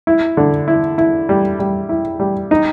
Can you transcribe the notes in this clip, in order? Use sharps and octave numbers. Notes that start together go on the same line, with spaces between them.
E4
D3
E4
E4
G3
G3
E4
G3
D#4